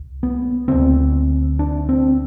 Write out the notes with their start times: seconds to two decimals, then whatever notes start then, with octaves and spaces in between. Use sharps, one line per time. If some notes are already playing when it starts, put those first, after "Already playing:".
Already playing: C2
0.23 B3
0.68 D2 D3 C4
1.59 D4
1.89 C4